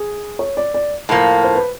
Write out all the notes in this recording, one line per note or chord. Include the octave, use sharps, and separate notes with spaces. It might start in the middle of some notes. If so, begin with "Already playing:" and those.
Already playing: G#4
C#5
D5
D5
A2 F3 A#3
C5
B4